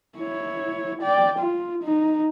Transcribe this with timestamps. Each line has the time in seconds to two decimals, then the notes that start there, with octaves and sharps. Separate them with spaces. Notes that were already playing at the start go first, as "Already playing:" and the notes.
0.18 E4 C#5
1.02 D5 G5
1.39 F4
1.83 D#4